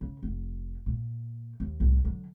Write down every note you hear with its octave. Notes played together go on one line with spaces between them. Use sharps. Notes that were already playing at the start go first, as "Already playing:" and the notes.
C#3
F1
A#2
D#2
C2 A2
D3 F#3